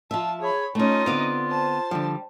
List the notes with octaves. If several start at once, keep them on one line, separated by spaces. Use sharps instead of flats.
F3 F4 E5 A5
G#4 C#5 B5
A3 C#4 D#4 F4 D#5
D3 B3 C4 D5 F5
C5 A5
D3 F3 G3